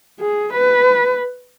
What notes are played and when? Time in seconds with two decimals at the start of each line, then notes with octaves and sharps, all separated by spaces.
0.20 G#4
0.53 B4